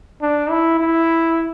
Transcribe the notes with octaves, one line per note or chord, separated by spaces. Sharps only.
D4
E4
E4